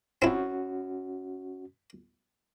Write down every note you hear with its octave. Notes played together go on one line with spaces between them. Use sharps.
C4 C#4 E4 F#4